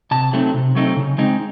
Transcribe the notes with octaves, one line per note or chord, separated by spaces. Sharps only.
C3 A5
F#3 A3 C4 D#4
C3
F#3 A3 C4 D#4
C#3
G#3 C4 D#4